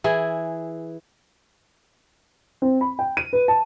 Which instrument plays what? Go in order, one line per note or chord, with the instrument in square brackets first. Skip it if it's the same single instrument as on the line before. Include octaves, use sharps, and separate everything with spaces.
[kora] E3 E4 G#4
[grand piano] C4
B5
G5
D#7
B4
A5